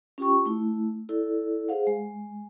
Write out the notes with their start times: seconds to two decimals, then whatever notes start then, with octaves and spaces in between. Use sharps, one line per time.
0.18 C#4 F4 G4 G5 C#6
0.46 A3 E4
1.09 E4 A4 D5
1.68 G#4 C5 F5 F#5
1.87 G#3